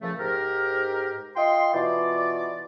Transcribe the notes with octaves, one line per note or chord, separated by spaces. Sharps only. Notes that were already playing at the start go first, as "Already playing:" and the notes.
A#2 C#3 F3 A3
G#2 G4 A#4
F4 D#5 G5 C6
B2 E3 F4 D5